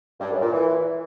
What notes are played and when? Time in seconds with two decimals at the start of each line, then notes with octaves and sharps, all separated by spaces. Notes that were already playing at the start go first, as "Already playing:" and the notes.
0.20 G2
0.31 F#2
0.42 A#2
0.52 E3